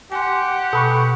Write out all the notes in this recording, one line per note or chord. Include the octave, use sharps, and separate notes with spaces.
G4 F#5 G#5 C6
B2 A4 B5 C#6